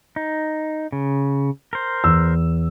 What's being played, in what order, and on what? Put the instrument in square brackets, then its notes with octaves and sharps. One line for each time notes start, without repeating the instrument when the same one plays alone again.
[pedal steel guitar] D#4
C#3
A#4 C5
[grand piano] E2 E6